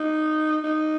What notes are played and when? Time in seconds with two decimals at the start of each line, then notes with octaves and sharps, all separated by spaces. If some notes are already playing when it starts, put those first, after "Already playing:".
Already playing: D#4
0.64 D#4